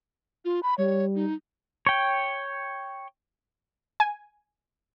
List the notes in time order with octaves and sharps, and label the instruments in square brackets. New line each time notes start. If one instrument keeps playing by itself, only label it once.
[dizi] F4
B5
[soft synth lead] G3 [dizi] C#5
[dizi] D#4
[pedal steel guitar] C#5 G5
[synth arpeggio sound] G#5